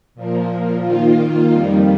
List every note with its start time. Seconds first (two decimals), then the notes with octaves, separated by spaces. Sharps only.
0.15 A#2 F3 A#3
0.82 D#3 A#3 F4
1.50 F2 D#3 G3